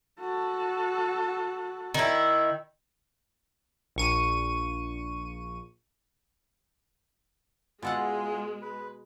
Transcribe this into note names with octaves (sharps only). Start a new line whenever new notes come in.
F#4 A4
D#3 E4
A#1 C#6 D#7
B2 G#3 F4 G#4 A4 F#5
B4